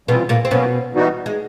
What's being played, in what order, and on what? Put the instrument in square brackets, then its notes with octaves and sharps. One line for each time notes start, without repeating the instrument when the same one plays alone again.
[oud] B2 B3 [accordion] E3 G3 C4 F4
[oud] A#2 A#3
C4
[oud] B2 B3 [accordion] F#3 A#3 C#4
[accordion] E3 G3 B3 D#4 F#4
[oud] G#3